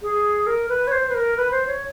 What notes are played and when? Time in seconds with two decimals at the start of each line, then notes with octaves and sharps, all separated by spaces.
0.02 G#4
0.47 A#4
0.69 B4
0.87 C#5
0.92 C5
1.09 B4
1.15 A#4
1.37 B4
1.51 C5
1.67 C#5